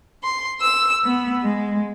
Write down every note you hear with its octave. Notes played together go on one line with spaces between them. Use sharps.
C6
E6
B3
G#3